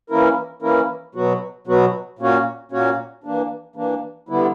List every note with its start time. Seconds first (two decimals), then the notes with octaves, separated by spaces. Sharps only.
0.10 E3 A#3 C#4 E4 A#4
0.62 E3 A#3 C#4 E4 A#4
1.15 B2 F#3 B3 F#4
1.67 B2 F#3 B3 F#4
2.19 A#2 A#3 C#4 F#4 C#5
2.72 A#2 A#3 C#4 F#4 C#5
3.24 E3 A#3 D4
3.76 E3 A#3 D4
4.29 D3 G3 B3 E4